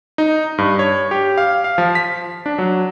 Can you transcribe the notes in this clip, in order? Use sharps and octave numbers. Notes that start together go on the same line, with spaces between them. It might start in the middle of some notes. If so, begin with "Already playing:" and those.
D#4
G2
C#5
G4
F5
F5
F3
B6
D4
F#3